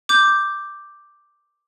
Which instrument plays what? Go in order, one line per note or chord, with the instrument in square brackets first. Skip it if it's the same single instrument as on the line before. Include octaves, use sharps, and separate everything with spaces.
[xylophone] D6 G6